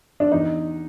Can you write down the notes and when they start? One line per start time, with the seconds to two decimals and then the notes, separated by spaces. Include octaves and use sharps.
0.20 D4
0.32 E2 D#4